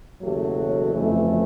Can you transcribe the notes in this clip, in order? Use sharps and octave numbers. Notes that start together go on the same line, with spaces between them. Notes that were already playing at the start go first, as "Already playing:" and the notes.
F#1 E2 B2 F#3 A3 G4
C#5
G1 F2 C#3 E3 A3